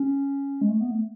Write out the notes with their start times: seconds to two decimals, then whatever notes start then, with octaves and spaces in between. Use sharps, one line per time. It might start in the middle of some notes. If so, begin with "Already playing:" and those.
Already playing: C#4
0.61 G#3
0.69 A3
0.81 B3
0.91 A3